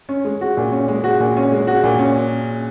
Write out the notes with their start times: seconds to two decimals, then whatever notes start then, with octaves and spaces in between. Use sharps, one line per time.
0.09 C#4
0.25 G#3
0.41 F#4
0.57 A#2
0.72 C#4
0.88 G#3
1.04 F#4
1.20 A#2
1.37 C#4
1.52 G#3
1.67 F#4
1.84 A#2
1.99 C#4